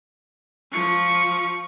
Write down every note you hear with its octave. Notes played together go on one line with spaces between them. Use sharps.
F3 C#6